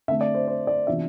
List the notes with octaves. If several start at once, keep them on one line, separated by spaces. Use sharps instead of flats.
D3 A3 C4 E5
D5
C5
C5
D5
C3 E3 B3 D4 F4 E5